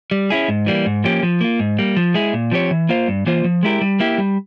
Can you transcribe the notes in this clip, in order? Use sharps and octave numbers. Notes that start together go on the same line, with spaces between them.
G3
C#4 E4 G#4
G#2
E3 G3 A#3
G#2
F3 A#3 C#4 G4
F3
A#3 F4
G#2
G3 A#3
F3
G#3 E4 G#4
A#2
F3 C4 G4 C#5
E3
A#3 F4 C5 F5
G2
E3 A#3 F4 C5
F3
G#3 E4 G4 A#4
G3
A#3 E4 G4
G3